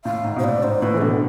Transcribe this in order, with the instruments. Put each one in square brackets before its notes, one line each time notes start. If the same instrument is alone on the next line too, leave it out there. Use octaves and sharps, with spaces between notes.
[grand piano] A2 [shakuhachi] F5
[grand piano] G#2
B2
[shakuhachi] C5
[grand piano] A2 [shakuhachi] D5
[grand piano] G#2 [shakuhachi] C5
[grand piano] A2 [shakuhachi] B4
[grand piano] E3
[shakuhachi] G#4
[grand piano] B2 D3 [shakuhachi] A4